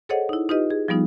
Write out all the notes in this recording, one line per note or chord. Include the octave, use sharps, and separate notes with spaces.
G#4 A4 C5 C#5 D#5 F#5
D#4 E4
D#4 F4 G4 B4 D#5
G#4
F3 G3 B3 D#4 F4